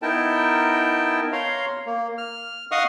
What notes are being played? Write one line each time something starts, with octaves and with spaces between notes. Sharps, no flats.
B3 D#4 E4 A#4 G5 A5
C#5 F5 A#5 C6
A#3
F6
D#5 F5 F#5 C#6 D#6 F6